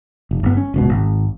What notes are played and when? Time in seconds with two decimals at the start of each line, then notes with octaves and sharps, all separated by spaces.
0.31 F1
0.43 G1 B3
0.57 C#4
0.74 D1 C#2 B2
0.89 G#1